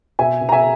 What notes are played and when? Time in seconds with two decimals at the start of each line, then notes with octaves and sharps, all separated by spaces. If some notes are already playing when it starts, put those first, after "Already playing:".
0.19 B2 E5 G#5
0.41 B2
0.49 A#5
0.52 E5 G#5